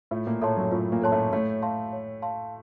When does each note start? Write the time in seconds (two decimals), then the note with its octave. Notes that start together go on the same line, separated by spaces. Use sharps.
0.11 A2 A3 F4
0.27 A#2 A#3
0.42 A2 A3 A4 C#5 A5 C6
0.57 F#2 F#3
0.71 A2 A3 F4
0.92 A#2 A#3
1.02 A4 C#5 A5 C6
1.12 A2 A3
1.32 A2 A3 C#5
1.62 F5 A5 C6
1.93 C#5
2.22 F5 A5 C6